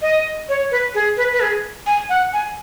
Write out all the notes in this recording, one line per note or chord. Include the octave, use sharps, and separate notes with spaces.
D#5
C#5
B4
G#4
B4
B4
G#4
G#5
F#5
G#5